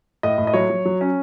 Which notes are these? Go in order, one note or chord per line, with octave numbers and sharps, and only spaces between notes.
A2 D#5
A2
D#5
F#3 C#5
F#3
F#3
C#4